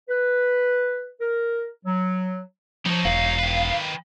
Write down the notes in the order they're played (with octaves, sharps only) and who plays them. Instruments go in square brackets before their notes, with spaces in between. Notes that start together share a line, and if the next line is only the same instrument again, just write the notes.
[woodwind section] B4
A#4
F#3
[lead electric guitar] F3 [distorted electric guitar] F#3 D#4
[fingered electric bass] E1 [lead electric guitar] F5
[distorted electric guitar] D#3 B4